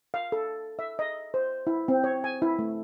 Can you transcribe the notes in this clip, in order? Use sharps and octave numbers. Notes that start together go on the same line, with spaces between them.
F5
A4
E5
D#5
C5
E4
C4
C#5
G#5
E4
A3